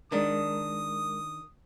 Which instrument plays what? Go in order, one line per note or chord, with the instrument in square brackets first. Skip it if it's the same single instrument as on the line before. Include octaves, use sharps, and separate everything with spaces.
[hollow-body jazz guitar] D#3 D4 [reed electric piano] G#3 A#4 [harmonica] D#6